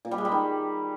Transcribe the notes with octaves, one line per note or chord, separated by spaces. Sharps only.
A#2
G3
G#3
G3
D#3